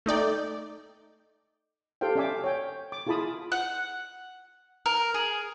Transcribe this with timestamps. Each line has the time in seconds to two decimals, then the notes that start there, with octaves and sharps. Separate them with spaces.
0.06 A3 D#4 D5 G5
2.01 G4 A4 C5 F5 G5
2.15 C#4 D5 E5 F5 G#5 D6
2.44 C#5 G5 G#5
2.92 D6
3.07 E4 F4 G#4 A5 B5 D#6
3.52 F#5
4.86 A#4
5.14 G#4